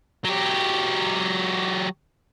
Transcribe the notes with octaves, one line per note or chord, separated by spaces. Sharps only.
F#3 G4